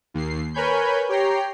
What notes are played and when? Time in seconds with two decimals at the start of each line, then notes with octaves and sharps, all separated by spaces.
0.14 D#2 C7
0.54 A#4 B4 C#5 G#5 B5 G6
1.09 G4 C#5 G5 A#5 C7